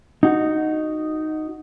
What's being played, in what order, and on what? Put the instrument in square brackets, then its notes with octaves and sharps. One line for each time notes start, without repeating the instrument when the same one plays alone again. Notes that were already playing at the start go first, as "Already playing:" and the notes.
[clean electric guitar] D#4 F#4